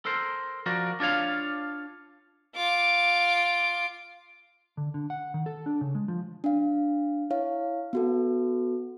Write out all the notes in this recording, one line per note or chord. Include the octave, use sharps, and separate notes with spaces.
A4 A#4 C5
F3 F#4 A#4 D5
D4 F4 C#5 F5
F4 D6
D3
D3
F#5
D#3
A4
D4
C#3
G#3
F3
D4 F5
E4 C#5 F5
B3 F#4 A4